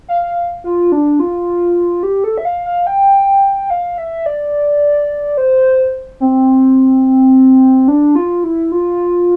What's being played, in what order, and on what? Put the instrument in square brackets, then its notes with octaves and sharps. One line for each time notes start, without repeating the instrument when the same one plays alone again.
[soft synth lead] F5
F4
D4
F4
G4
A4
E5
F5
F5
G5
F5
E5
D5
C5
C4
D4
F4
E4
F4